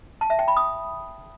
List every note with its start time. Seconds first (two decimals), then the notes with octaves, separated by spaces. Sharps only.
0.21 A5
0.30 E5
0.39 G5
0.48 B5
0.57 D#6